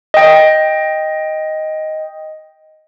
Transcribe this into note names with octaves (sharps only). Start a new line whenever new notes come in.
D#5 G5